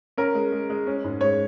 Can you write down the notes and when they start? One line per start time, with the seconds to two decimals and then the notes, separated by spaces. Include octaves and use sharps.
0.17 C#4 A#4
0.35 G#3
0.52 G#3
0.70 G#3
0.87 C#4
1.04 G#2
1.21 G#3 C#5